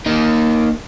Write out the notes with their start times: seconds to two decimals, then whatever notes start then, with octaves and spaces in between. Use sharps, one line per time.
0.06 A#3 D#4